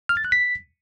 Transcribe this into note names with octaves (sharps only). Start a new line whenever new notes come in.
F6
A6
F#6
B6